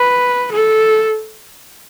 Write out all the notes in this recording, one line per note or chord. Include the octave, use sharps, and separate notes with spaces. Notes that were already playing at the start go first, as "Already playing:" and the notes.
Already playing: B4
A4